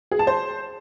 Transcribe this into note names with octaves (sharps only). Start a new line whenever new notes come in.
G#4
A5
C5